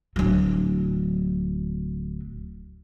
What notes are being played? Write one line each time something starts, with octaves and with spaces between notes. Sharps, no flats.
D1 F#3